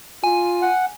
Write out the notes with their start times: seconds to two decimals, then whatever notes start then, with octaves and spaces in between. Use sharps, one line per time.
0.24 F4 G#5
0.62 F#5